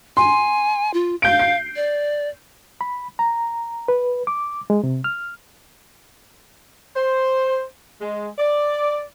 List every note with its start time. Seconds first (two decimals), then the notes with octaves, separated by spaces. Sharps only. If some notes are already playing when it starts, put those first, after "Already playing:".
0.17 G#5 C6
0.94 F4
1.22 F5 G6 D7
1.39 C7
1.76 D5
2.81 B5
3.19 A#5
3.88 B4
4.27 D6
4.70 G#3
4.84 C3
5.04 F6
6.96 C5
8.01 G#3
8.38 D5